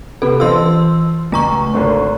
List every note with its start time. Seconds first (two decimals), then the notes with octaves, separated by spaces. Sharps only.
0.22 C3 B3 A4 B4
0.40 E3 F4 C5 D#5 C6 E6
1.32 C#2 A3 A#5 C#6
1.74 G#1 D3 C4